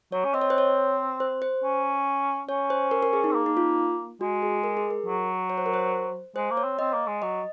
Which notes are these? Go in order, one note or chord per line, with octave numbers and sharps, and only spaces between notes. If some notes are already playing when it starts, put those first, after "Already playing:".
F#3 C#5
C#4
C4 D#5
C#5
C5
C#5
C5
C5
C#4
C#4 C#5
C5
A#4
A#4
G#4
D#4
C4
A#3
D#4
F4
G#3 F#4
G#4
A#4
G#4
A#4
F#3
C#5
C5
A#4
C5
G#3 C5
A#3
C#5
C4
C4 D#5
A#3
G#3
F#3 D#5